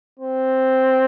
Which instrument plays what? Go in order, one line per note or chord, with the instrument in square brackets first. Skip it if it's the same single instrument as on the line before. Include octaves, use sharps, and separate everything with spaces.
[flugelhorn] C4